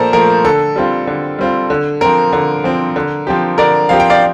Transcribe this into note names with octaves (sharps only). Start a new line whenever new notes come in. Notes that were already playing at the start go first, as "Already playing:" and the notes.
Already playing: A#2 F3 A3 A4 A#4 C5 D5
F3 A3 A#4
D3 A4
G3 C4 F4
D3
G3 C4 F4
D3
F3 C4 A#4
D3
F3 C4
D3
F3 C4 G4
D3 A#4 D5
F3 C4 G4 F5
G5
D5 F5